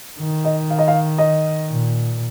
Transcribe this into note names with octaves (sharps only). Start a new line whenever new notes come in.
D#3
D#5
F5
D#5
F5
D#5
A#2